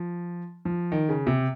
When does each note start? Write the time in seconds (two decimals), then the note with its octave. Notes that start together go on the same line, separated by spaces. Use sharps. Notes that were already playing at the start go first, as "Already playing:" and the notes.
Already playing: F3
0.65 F3
0.92 D#3
1.09 C#3
1.27 C3